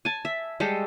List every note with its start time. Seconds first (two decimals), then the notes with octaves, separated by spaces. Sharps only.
0.05 G#5 A5
0.25 E5
0.60 G3 G#3 G4 A4